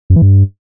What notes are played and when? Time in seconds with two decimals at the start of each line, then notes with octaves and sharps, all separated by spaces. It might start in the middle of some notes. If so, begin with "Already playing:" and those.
0.10 F#2
0.16 E3
0.22 G2